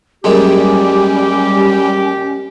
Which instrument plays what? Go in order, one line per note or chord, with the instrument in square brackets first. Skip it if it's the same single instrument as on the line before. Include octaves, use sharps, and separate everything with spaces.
[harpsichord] F#2 G#3 A#3 [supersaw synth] G3 [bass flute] C#4 [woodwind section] G4